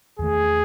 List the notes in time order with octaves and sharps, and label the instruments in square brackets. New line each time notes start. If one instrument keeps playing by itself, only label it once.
[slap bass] E2 D#3 A3 [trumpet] G#4